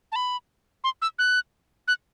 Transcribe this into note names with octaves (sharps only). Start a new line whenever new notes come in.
A5
B5
C6
E6
F#6
F#6